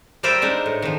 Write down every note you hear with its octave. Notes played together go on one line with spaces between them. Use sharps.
G3 A#4 C5 D5 E5 G5
G#3 D4 D#4
A2
D#3 F3